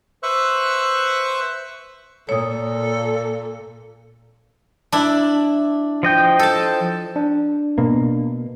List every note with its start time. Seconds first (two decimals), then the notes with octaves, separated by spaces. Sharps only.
0.23 B4 C5 E5 C#6 E6 F#6
2.29 A#2 A4 C#5 D#6
4.92 D4 E4
6.03 F3 D#5 G5
6.39 A4 A5
7.16 D4
7.78 B2 A#3